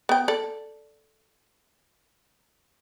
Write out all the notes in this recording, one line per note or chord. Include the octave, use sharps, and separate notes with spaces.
B3 G5
A4 D5